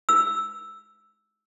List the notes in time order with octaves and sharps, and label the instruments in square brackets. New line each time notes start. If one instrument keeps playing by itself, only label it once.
[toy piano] E6